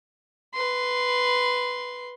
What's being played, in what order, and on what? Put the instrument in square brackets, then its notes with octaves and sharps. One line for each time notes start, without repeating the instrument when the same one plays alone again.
[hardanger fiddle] B4 C6